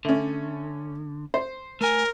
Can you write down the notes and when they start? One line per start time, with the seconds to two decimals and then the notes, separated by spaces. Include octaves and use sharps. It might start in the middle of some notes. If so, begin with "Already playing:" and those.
0.05 D3 A3 C#4
1.34 C5
1.81 A3 A#4 G#5